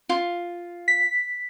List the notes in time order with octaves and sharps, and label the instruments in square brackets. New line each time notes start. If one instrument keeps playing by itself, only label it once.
[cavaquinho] F4
[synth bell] B6